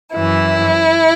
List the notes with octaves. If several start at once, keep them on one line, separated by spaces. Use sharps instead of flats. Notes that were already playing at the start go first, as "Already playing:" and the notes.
F#2 E3 E4